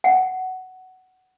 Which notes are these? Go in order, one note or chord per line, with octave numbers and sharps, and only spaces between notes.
F#5